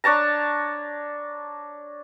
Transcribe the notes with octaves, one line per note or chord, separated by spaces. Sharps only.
D4 C#5 A5 A#5